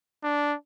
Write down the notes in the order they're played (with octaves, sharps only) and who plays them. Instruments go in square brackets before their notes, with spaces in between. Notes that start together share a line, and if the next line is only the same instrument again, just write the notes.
[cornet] D4